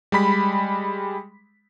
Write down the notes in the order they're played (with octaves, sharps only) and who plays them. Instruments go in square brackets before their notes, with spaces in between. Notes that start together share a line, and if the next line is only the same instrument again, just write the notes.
[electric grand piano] G3 G#3 B5 B6